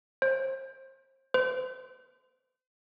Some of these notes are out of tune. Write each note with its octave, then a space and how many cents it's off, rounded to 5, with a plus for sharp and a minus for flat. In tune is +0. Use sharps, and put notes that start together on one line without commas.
C5 +30
C5 -35